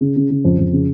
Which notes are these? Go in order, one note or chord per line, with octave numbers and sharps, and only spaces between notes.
C#3
C#3
C#3
F2
F2
C#3